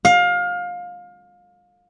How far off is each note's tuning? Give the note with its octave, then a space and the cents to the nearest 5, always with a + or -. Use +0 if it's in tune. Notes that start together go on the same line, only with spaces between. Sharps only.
F5 +25